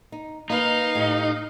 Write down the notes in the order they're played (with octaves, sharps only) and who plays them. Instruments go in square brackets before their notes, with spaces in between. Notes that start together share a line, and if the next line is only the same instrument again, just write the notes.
[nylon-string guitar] D#4
[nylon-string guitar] A#3 B4 [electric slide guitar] D#4 [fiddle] F5
[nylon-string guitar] A2 G4